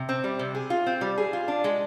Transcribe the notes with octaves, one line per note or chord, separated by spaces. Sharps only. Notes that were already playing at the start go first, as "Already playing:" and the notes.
Already playing: C3
C4
G3
C3
G#4
F4
C4
G3
G#4
F4
D4
G#3